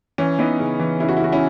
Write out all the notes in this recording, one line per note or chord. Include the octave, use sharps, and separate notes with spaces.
E3 C#4
E3 B3 D#4
C#3
E3
C#3 E4
F#4
E4
C#3 F#4
C#4 E4